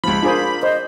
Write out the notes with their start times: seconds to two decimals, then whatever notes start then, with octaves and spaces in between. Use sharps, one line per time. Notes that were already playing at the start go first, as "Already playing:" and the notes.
0.04 C#2 F3 B5
0.22 D4 F4 G#4 A#4 C5
0.63 C5 D#5